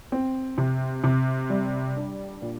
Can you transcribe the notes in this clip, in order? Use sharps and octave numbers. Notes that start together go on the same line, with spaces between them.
C4
C3
C3
G3
D4
A#2